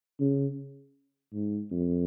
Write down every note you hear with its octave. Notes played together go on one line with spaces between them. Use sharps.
C#3
G#2
F2